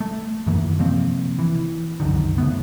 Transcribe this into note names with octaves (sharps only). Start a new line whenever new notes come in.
A3
F#2 D#3 E3 A#3
C3 F3 A#3 C4
E3
C2 F#2 D3 D#3
C#3 A3 B3